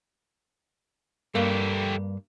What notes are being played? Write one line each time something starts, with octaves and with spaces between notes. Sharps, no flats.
G2 A3 A#3 G4